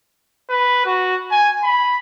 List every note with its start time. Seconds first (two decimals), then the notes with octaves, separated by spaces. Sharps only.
0.49 B4
0.86 F#4
1.31 G#5
1.63 B5